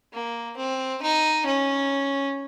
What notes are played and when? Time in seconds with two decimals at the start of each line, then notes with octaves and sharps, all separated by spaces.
0.13 A#3
0.56 C4
1.02 D#4
1.46 C#4